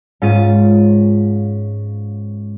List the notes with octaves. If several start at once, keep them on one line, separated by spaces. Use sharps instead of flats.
G#2 C#4 F4 A6 D#7